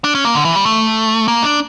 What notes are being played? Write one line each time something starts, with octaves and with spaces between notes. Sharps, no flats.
D4
C#4
A#3
D3
E3
G3
A3
A#3
D4